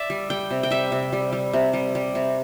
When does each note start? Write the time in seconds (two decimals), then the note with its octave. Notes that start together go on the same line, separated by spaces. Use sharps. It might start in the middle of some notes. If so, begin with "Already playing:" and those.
Already playing: D5 E5
0.10 G3
0.30 G3 G5
0.51 C3
0.63 G5
0.71 G3 E5
0.92 C3
1.13 G3
1.33 G3
1.53 C3
1.73 G3
1.95 G3
2.15 C3